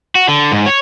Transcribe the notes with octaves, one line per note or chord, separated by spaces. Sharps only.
F#4
D3
G#2
C#5